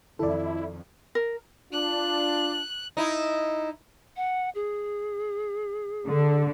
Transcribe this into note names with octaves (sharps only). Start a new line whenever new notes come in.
F2 D#3 E4 A4 D5
A#4
D4 F4 F#6
D#4 E4
F#5
G#4
D3